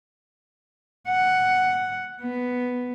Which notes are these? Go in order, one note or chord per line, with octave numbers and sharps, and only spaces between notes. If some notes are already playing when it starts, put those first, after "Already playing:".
F#5
B3